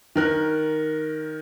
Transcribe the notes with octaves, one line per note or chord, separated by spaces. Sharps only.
D#3 A#4 F#6